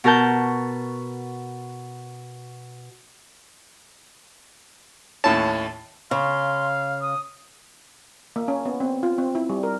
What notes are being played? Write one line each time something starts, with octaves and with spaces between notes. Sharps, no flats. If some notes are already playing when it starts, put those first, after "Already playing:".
B2 F#4 A#4 A5 G6
D#2 A2 C#4 A5
C#3 F5 C6
D#6
A#3
C#4
B3
C4
F4
C4
E4
G3
A#4